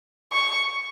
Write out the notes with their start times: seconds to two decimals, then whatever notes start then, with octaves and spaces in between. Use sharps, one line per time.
0.32 C#6